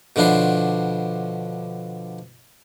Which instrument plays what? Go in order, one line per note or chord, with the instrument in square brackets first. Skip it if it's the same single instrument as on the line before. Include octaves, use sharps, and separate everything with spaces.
[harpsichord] B2 D3 F3 D4 E4 C6